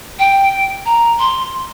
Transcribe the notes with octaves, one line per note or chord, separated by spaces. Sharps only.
G5
A#5
C6